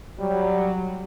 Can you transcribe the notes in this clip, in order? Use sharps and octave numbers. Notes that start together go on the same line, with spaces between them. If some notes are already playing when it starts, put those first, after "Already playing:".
F#3 G3